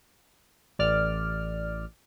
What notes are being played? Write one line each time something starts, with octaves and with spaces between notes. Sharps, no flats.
A1 D5 F6